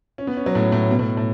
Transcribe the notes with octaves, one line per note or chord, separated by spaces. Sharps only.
C#4
B3
C#4
F#3
A2
A2
B2
A2
A2